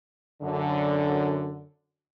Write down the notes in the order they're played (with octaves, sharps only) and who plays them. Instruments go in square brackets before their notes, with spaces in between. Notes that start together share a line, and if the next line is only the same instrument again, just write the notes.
[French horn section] F#2 D3